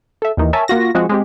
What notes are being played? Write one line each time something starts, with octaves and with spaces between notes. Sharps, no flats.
A4 E5
D#2 D#3 E3
A#4 C#5 E5 G#5 A5
A#3 F4 F#4 A#6
F3 G#3 C4 F#4
G#3 C4 G4